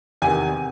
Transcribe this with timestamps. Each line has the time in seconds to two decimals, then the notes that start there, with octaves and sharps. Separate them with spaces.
0.22 E2 C3 D#3 G#5